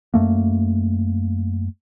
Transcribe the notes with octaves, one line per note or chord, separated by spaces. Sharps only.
F#2 A3 A#3